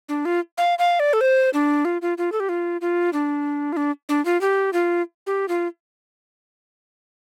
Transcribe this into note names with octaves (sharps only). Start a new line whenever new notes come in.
D4
F4
F5
F5
D5
A4
C5
D4
F4
F4
F4
A4
G4
F4
F4
D4
F4
D4
D4
F4
G4
F4
G4
F4